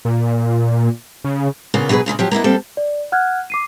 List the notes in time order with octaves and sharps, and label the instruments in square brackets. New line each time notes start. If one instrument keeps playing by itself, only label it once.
[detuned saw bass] A#2
C#3
[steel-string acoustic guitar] A#2 C#3 A#3 B3 F4
B2 F#3 F#4 G#4 B4
A#2 C#3 E3 G#3
F3 F#3 G4
A#3 B3 E4 D#5
G3 A#3 C4 A4
[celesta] D5
F#5 F6 F#6 G#6
D6 C7 D#7